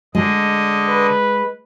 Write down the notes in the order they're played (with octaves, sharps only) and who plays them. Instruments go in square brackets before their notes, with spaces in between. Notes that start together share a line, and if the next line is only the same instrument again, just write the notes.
[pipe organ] D3 D#5 [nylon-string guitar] G#3
[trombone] B4